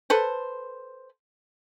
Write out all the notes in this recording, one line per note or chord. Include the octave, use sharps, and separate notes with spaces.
A4 B4 C5